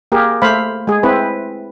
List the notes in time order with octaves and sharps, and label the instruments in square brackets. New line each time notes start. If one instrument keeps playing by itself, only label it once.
[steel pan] A#3 G4 G#4 A#4
A3 C5 F5 B5
G#3 G#4
C4 E4 B4